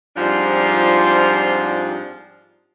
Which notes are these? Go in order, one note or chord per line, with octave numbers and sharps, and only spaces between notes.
G#2 F3 G3 C4 D4 F4